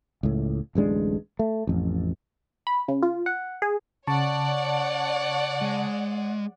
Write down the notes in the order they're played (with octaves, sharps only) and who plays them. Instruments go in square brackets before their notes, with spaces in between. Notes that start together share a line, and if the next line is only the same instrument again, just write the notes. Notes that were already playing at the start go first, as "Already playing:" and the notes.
[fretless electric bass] C#2 A2
D1 A1 G#3 D4
A3
A1 F2
[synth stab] B5
C#3
F4
F#5
G#4
[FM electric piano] C#3 A5 C#6 [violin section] C#5 D5 F#5
[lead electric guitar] G#3